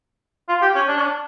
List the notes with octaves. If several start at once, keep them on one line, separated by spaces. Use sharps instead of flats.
F4
G4
C#4
D4
C#4
D4